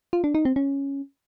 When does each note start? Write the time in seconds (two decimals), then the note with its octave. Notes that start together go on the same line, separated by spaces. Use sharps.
0.13 F4
0.24 D4
0.35 D#4
0.45 C4
0.56 C#4